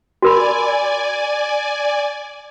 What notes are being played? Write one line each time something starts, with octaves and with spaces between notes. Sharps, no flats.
F#4 A#4 D5 G#5 B5